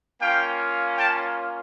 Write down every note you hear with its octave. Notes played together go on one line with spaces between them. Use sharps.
A#3 C#4 F4 F5 G5
G5 A5